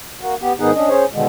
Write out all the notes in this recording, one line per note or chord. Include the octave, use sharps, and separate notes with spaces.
A#3 F#4
B3 G4
G#2 D#3 B3 D#4 G#4 F#5
C#4 D4 D#5
C#4 G#4 C5 C#5
B2 D3 D#3 G#3